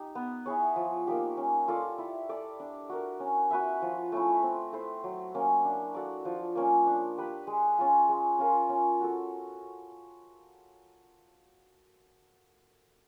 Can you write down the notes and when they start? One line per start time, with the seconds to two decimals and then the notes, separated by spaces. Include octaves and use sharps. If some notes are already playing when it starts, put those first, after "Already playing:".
Already playing: D#4 G4
0.15 B3
0.46 E4 G#4 C#5
0.76 F3
1.07 A#3 D#4 G4
1.37 C#4
1.68 F4 A4 D5
1.98 E4
2.29 A4 D5
2.60 D4
2.89 F#4 A#4
3.20 C#4
3.51 F#4 B4 E5
3.82 F3
4.12 A3 C#4 E4
4.43 C4
4.73 E4 A4 C5
5.04 F#3
5.35 A#3 C#4
5.65 D4
5.95 F#4 A4 D5
6.25 F3
6.55 A#3 C#4
6.87 D4
7.18 G4 B4
7.47 G#3
7.78 C#4 F4
8.09 G#3
8.39 C#4 F4 A#4
8.69 C#4
9.01 F#4 A4